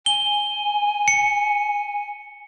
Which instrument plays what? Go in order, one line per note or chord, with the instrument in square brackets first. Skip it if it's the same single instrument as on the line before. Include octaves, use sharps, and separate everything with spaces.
[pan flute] G#5 [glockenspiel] G7
[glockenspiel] C#7